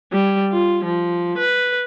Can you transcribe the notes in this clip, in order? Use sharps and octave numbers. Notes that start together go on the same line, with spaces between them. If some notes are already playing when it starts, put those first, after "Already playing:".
G3
F4
F3
B4